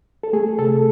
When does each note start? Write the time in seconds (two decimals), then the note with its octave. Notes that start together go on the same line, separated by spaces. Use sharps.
0.23 A4
0.33 A3 G#4
0.59 C3 A4